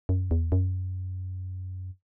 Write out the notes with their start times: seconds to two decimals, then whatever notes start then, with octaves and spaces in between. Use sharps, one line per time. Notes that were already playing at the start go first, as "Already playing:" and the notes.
0.09 F#2
0.31 E2
0.52 F#2